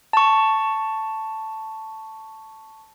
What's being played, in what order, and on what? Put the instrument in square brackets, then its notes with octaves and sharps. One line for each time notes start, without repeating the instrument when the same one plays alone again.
[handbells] A5 C#6